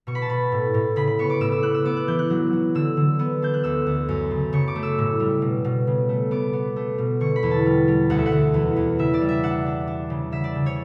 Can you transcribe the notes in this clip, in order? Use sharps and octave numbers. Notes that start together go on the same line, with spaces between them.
B2 C#6
B5
A5
B2 B5
A2
A2
C#3 B5
B5
B3 C#6
D6
A2 E6
E6
B3 F#6
E6
B3 D6
F#6
E3 G6
F#6
F#3
F#3
D3 E6
D3
B3
D4 G6
F#6
D2 E6
D2
F#2
C#3
C#3 C#6
D6
A3
E6
A2
G3
B2
B2
C#3
A3
B3 D6
B3
A3
B2
D3 C#6
B5
E2
A5
G3
G3
D2 F#5
E5
F#5
D2
E2
E2
C#3 E5
D5
G3
E5
D4 F#5
D4
D4
C#3
C#3 E5
D5
C#3
C#5